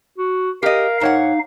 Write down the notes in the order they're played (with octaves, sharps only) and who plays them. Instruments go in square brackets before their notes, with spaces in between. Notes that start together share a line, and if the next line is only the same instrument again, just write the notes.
[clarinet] F#4
[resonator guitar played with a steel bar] G4 D#5 [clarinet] A#4 [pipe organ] F5
[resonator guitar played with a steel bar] G#2 C#5 F#5 [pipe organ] D#4 F5